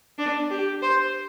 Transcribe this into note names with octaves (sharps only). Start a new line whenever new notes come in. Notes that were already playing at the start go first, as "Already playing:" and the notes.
D4
G4
C5